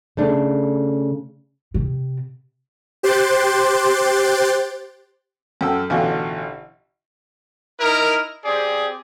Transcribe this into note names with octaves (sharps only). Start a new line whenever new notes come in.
C#3 A3 D4
C3
G4 C5 C6 F#6 A6 D7
F#2 A4 G5 E6
A1 B2 D3 F4 G5 G#5
D#4 E4 A#4
C4 G4 G#4 D5